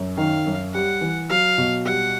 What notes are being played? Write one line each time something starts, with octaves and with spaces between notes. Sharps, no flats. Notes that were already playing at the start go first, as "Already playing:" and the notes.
Already playing: F#2
D#3 F5
F#2
G3 F#5
E3
F#3 F5
B2
G3 F#5